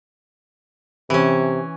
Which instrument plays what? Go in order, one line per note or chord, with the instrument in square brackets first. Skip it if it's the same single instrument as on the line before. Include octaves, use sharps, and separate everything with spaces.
[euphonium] C3 [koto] E3 C#4